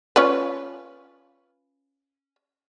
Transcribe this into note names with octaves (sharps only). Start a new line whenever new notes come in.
C#4 F4 B4